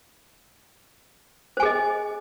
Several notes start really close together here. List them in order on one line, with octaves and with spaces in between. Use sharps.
C5 G#5 G#4 D#5